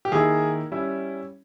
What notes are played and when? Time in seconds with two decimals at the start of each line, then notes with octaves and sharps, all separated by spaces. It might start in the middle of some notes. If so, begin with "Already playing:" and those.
0.05 G4
0.12 D#3 A#3 E4 G#4
0.72 G3 C#4 E4